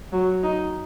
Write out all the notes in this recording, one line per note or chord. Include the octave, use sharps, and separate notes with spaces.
F#3
D#4